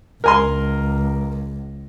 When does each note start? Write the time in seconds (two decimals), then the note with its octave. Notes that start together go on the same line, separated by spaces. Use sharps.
0.24 C#2 A#4 G#5 C6